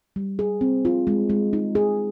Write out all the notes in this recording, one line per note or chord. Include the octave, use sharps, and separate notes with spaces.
G3
G#4
C4
F4
G#3
G#3
D#4
G#4